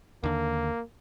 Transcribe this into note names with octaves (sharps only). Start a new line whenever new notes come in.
D#2 D3 A#3